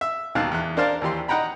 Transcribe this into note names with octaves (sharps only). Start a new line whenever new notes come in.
E5
D#2 B2 D#3 F5 A5 F#6
E2 F#6
D4 A#4 C5 D5 F5 A5
D#2 E3 G4 C6
D#4 D#5 F#5 G5 A#5 B5